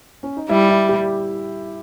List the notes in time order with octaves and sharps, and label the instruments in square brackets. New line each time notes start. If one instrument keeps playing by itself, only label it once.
[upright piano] C#4
D#4
[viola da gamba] G3 [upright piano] E4
[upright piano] E4
G4